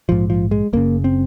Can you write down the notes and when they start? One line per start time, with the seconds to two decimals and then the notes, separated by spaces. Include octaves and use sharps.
0.09 A#1 G#2 F3
0.30 F3
0.51 G#3
0.73 F#1 F#2 C#3 A#3
1.04 C4